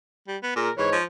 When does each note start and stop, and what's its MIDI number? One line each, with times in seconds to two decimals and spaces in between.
0.28 0.37 55
0.43 0.54 59
0.56 0.69 46
0.56 0.71 68
0.56 0.71 70
0.78 0.97 44
0.78 0.89 52
0.78 0.97 73
0.92 1.04 53